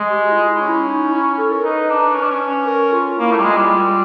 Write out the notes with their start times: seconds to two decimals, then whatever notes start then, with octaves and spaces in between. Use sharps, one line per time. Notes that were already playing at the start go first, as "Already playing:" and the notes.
Already playing: G#3
0.09 G4
0.23 F#4
0.31 E4
0.35 F4
0.48 E4
0.61 C#4 E4
0.87 D#4
1.12 E4
1.38 A4
1.51 A#4
1.64 D#4 B4
1.90 D4
2.15 C#4
2.23 D4
2.30 C#4
2.66 A#4
2.92 F4
3.18 A#3 E4
3.31 A3
3.38 G3
3.43 G#3 F4
3.56 G3
3.69 F4